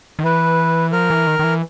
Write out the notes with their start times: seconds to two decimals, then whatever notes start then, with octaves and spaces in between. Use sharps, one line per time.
0.19 D#3
0.24 E3 B4
0.92 F3 A#4
1.10 E3
1.27 D#3
1.39 D#3
1.44 E3